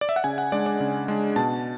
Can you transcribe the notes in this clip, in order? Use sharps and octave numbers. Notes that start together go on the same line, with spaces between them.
D5
E5
F#5
C#3 G#5
F#5
G#3 D4 D5
D5
C#3
G#3 D4
B2 A5